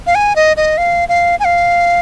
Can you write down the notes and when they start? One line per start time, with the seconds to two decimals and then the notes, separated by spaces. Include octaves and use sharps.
0.07 F5
0.15 G#5
0.36 D#5
0.57 D#5
0.78 F5
1.09 F5
1.40 G#5
1.45 F5